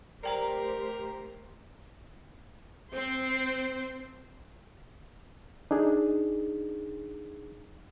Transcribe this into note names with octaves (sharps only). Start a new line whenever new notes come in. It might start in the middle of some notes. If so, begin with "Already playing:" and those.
A3 G4 A#4 C5 D5 G5 A#5
C4 C5
D4 D#4 G#4